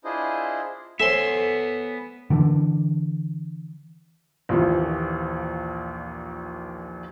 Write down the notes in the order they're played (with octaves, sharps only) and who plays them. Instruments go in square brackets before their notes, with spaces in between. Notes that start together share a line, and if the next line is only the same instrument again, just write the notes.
[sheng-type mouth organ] D4 E4 F4 G#4 C5 D#5
[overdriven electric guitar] B3 G#5 [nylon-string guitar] A4 C5 C#5 [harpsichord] E5 C6
[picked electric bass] D3 E3 C#4 D4
[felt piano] A#1 D#2 A#2 E3 F3